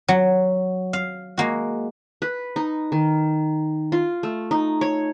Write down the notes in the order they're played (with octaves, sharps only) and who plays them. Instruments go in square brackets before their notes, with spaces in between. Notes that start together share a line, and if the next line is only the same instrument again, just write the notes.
[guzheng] F#3
F5
G#3 A#3 F#4
[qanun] B4
D#4
D#3
F4
A3
D#4
C#5